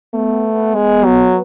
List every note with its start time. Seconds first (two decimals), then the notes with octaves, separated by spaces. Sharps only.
0.13 A3 B3
0.55 B3
0.75 G#3
1.05 F#3